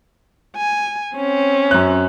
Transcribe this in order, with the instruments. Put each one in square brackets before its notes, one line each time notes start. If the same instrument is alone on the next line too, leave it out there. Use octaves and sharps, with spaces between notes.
[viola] G#5
C4 C#4
[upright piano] F#2 F#6